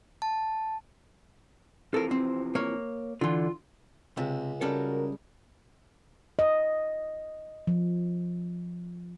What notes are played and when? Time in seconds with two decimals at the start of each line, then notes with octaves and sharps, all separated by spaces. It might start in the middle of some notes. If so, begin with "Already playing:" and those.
0.22 A5
1.94 C3 E3 F3 A4 A#4
2.11 C4
2.55 A#3 C#5
3.21 D3 E3 F4 C6
4.17 C#2 C3
4.61 C#3 G3 G#3 C#4 F#4 A4 A#4
6.39 D#5
7.67 F3